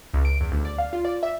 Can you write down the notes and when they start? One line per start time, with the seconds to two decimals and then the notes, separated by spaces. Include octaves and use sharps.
0.14 C#2
0.25 D7
0.41 E2
0.52 D2
0.65 D5
0.78 F5
0.93 F4
1.05 D5
1.23 E5